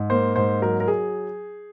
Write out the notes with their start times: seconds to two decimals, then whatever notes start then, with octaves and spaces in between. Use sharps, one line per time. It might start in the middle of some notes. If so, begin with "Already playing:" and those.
Already playing: G#2
0.10 A#3 C5
0.36 G#2 C5
0.62 F#3 A#4
0.80 A#4
0.88 G#4